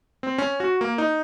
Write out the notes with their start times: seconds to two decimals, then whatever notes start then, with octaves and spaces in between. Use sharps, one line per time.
0.23 C4
0.38 C#4
0.60 F#4
0.81 A#3
0.98 D#4